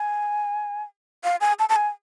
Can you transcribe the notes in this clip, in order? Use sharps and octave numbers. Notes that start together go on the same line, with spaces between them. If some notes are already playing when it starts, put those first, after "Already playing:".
Already playing: G#5
F5
G#5
A5
A5
G#5